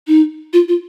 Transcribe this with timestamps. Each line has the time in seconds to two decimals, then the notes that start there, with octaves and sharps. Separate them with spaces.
0.08 D#4
0.53 F4
0.68 F4